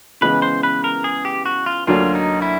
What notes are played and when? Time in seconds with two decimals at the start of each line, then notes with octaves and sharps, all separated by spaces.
0.21 C#3 E3 G#3 B3 B4
0.42 C5
0.63 B4
0.84 A#4
1.04 G#4
1.25 G4
1.45 F#4
1.66 F4
1.87 D2 D3 F#3 A#3 D4 F4
2.15 D#4
2.42 E4